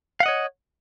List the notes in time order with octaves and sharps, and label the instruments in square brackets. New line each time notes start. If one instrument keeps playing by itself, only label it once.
[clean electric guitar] F5
F#5
D#5
C#5